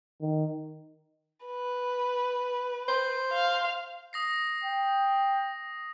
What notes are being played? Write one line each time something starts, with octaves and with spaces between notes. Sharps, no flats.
D#3
B4
C5
F5
D#6 A#6 C7
G5